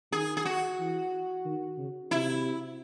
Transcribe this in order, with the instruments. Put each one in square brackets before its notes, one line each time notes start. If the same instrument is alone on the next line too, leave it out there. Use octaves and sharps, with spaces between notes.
[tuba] D#3 [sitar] G#4
[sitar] G#4
F#4
[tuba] E3
D#3
C#3
[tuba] C3 [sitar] E4